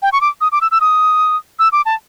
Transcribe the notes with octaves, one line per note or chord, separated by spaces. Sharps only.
G5
C#6
D6
D#6
D6
E6
E6
D#6
E6
D6
A5